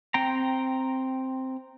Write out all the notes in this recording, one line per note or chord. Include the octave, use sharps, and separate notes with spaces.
C4 G5 A#5